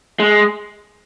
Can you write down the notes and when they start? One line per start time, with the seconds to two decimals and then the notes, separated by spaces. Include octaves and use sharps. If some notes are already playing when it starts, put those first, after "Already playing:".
0.20 G#3